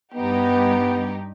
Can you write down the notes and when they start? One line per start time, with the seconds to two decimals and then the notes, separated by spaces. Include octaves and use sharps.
0.14 G2 B3 D#4 G4